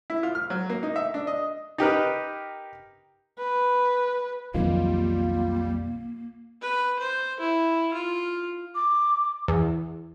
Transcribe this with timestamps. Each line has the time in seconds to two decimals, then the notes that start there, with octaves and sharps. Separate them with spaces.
0.10 E4
0.23 F4
0.35 F6
0.50 F#3
0.70 A#3
0.83 D#4
0.96 E5
1.14 D4
1.27 D#5
1.78 D#4 G4 A#4 B4
3.39 B4
4.54 B1 F2 D#3 G3 A#3 F4
6.61 B4
6.99 C5
7.40 E4
7.93 F4
8.75 D6
9.48 E2